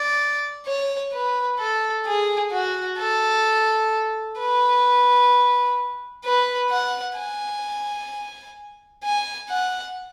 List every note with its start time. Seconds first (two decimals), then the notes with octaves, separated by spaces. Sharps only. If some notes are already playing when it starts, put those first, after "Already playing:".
Already playing: D5
0.66 C#5
1.12 B4
1.59 A4
2.06 G#4
2.52 F#4
2.99 A4
4.39 B4
6.25 B4
6.70 F#5
7.17 G#5
9.04 G#5
9.50 F#5